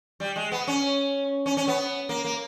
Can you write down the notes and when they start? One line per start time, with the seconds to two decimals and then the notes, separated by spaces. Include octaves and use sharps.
0.20 G3
0.36 G#3
0.52 B3
0.67 C#4
1.46 C#4
1.57 C#4
1.68 B3
2.09 A#3
2.24 A#3